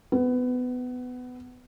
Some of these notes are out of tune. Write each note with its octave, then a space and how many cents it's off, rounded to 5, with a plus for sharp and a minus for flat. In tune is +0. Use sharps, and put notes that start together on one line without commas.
B3 +20